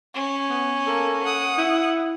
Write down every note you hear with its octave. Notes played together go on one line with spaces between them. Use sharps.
C#4
B3
A#3 A4
F#5 D#6
E4